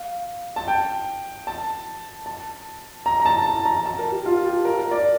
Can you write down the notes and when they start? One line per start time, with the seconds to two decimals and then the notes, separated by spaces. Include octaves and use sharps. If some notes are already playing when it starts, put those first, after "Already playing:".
Already playing: F5
0.56 A5
0.68 G5
1.47 A5
2.26 A5
3.06 A#5
3.20 A#5
3.26 A5
3.46 A5
3.65 A#5
3.86 A5
3.99 A#4
4.12 G4
4.26 F4
4.45 G4
4.65 A#4
4.79 A#4
4.91 D5